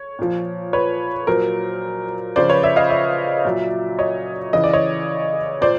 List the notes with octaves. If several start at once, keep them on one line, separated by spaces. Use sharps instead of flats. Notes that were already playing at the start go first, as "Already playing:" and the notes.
Already playing: C#5
A#2 F3
B4 C#5
A#2 F#3 A#4 C5
C#3 F3 C5 D5
B4 C#5
D5 E5
D#5 F5
D5 E5
A#2 F#3
C#5 D#5
C#3 E3 D#5
D5
C#5 D#5
A#2 C5 D5